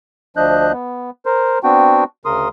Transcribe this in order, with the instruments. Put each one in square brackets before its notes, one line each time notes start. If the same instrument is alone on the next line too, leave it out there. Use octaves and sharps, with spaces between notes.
[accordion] D2 F3 D4 D#5 F#6 G6
B3
A#4 C5
B3 C4 D4 F#4 G5
D2 C#3 A#4 C6 D#6